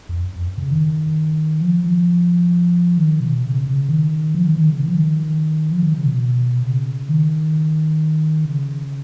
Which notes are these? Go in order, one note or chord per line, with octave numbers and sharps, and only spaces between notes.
F2
F#2
F2
F#2
C#3
D#3
F3
F3
D#3
B2
C#3
C#3
D#3
F3
D#3
D#3
C#3
D#3
F3
D#3
F3
D#3
C#3
B2
C#3
D#3
C#3